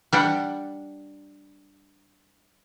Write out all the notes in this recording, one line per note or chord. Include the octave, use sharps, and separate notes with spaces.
G3 D4 F#5